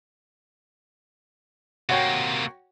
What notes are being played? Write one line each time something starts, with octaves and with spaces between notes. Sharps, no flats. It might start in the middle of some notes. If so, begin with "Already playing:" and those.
C3 A#3 F#4 C#5 G5